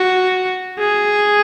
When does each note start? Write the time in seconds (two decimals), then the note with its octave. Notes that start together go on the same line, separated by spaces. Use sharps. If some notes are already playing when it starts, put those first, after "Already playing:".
Already playing: F#4
0.79 G#4